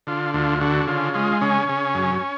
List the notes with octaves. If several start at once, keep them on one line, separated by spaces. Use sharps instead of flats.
D3 F4
D2 F4
D3 F#4
C#3 F4
G#3 F4
C#3 C#4
C#3
F#2